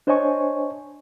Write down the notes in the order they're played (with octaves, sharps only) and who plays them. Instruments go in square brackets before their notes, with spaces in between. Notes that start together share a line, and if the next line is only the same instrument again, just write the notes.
[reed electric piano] D4 C5 C#5 D#5 G#5 C#6